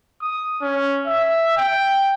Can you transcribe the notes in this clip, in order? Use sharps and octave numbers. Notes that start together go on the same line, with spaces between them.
D#6
C#4
E5
G5